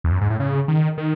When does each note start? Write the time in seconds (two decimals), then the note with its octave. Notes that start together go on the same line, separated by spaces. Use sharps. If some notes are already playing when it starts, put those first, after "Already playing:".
0.04 E2
0.11 F#2
0.21 G#2
0.30 A2
0.40 C#3
0.68 D#3
0.98 D#3